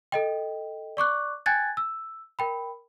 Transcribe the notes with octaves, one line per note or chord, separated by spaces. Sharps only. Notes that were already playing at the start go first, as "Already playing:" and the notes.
A4 D#5 G5
D5 C#6 D6 F#6
G5 G#5 F#6 G#6 A6
E6
A#4 G5 B5